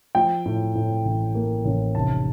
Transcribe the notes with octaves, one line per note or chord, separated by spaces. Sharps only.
F3 G5
A2
A2
A1
A#3
A1
F1 A5